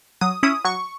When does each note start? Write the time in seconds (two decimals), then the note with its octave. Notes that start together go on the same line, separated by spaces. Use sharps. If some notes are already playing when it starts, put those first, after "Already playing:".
0.21 F#3 D#6
0.43 C#4 E4 D#6
0.64 F#3 C#6